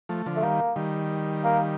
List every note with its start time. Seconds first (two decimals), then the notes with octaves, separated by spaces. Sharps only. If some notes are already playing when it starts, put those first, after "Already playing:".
0.09 F3 A3
0.26 D3 F3
0.36 A3
0.42 D#3 G3 A#3
0.76 D#3 G3
1.44 A#3